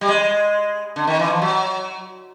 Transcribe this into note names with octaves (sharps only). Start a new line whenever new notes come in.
G3
G#3
D3
D#3
E3
F3
F#3